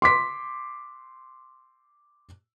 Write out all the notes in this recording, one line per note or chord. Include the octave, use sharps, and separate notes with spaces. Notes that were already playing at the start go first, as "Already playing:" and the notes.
C6 D6 B6